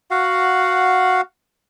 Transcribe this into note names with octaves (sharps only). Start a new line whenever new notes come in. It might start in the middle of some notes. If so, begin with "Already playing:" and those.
F#4 F5 F#5